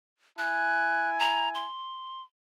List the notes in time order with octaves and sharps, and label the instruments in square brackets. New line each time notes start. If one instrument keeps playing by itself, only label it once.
[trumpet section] E4 G#5 [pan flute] F#6
[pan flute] A#5
C6